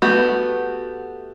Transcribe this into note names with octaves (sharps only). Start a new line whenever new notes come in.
A3 B3 F#4 G4